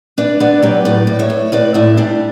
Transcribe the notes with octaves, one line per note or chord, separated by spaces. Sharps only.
D4 B4 D5
B3 B4 D5
F#3 G4 B4
A2 B4 D5
A2
C#5 E5
A2
A2 B4 D5
A2 E4
G3 D4